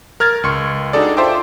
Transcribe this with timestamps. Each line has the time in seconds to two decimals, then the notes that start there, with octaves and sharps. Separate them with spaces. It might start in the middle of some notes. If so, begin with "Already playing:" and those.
0.20 A#4 F6 G#6 A6
0.43 C#2 C6 C#6 C#7
0.93 D4 D#4 F#4 G#4 A4 D5
1.17 F4 C5 E5 G5 A5 D6